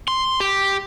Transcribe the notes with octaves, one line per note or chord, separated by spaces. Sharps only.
C6
G4